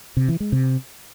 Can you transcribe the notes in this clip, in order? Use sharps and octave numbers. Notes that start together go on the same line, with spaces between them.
C3
E3
G#3
C3